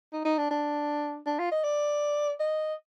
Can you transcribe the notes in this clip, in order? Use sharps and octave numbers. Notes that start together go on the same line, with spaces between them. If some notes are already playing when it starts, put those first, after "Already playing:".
D#4
D#4
D4
D4
D4
F4
D#5
D5
D#5